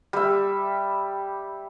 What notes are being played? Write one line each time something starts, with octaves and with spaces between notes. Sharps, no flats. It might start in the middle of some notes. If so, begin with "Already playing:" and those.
G3 E5